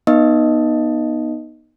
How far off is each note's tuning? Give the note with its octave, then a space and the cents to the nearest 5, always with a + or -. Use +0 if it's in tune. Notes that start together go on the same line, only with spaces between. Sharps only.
B3 -25 D#4 -10 D#5 +0